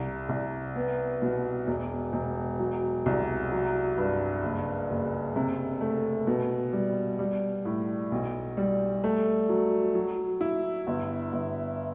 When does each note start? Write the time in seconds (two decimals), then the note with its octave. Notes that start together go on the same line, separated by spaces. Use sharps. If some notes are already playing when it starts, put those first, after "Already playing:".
Already playing: C2
0.29 C2
0.76 B3
1.22 B2
1.67 E1
2.13 E1
2.59 F#3
3.06 C2
3.52 F#3
3.98 G2
4.43 F#1
4.90 F#1
5.36 C3
5.81 A3
6.27 B2
6.73 G3
7.19 G3
7.65 A2
8.12 B1
8.57 G3
9.04 A3
9.49 F#3
9.95 F#3
10.41 E4
10.87 G1
11.33 G1